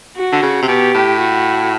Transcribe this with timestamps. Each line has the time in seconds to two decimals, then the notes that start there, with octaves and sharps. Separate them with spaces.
0.17 F#4
0.33 D3
0.43 C#3
0.62 C3
0.68 B2 G4
0.95 A2
1.20 F#4